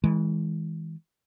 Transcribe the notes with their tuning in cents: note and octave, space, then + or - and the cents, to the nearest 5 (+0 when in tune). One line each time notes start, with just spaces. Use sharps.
E3 -35 G#3 +0